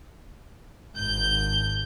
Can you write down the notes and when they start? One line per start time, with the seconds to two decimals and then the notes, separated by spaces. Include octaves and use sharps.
0.94 G#1 G6